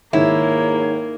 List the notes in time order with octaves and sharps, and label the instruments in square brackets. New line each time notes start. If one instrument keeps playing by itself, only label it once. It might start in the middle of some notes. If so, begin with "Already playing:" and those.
[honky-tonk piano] G#2 D#3 [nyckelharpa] A#3 [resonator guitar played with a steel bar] E4 [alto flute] C#5